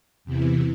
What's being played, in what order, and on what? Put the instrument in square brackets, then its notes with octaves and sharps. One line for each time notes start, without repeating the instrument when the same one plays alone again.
[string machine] E2 C3 E3